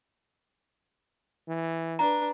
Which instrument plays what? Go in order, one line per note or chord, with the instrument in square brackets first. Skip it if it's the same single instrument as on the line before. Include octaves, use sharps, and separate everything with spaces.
[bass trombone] E3
[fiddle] D4 B4 [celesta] A#5